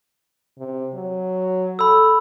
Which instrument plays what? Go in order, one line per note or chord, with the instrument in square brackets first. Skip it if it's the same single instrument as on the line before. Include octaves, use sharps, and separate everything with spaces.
[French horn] C3
F#3
[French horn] A4 [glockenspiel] B5 E6